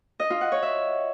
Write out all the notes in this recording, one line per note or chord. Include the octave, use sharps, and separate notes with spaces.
D#5
F4
F#5
C#5
E5